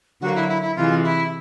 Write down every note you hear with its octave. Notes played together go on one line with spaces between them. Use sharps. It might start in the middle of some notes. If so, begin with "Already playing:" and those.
D3 F#3 A#3 F#4
E4
E4
E4
C3 E3 G#3 F4
E4